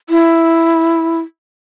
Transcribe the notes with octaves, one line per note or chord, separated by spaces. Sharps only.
E4